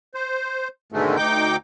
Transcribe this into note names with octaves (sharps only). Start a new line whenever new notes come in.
C5
G#2 B2 D3 D#3 G#3 A3
D2 D#4 G5 D6 G6